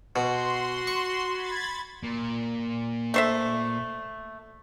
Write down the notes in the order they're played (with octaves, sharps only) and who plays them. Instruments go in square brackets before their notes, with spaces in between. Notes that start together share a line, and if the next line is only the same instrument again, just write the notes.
[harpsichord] B2 [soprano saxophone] F#4 [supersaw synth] C6
[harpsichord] C#6
[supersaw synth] B5 G#6 A6
[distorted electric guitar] A#2
[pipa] A3 C5 E5